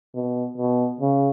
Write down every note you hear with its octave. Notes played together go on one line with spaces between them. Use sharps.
B2
B2
C#3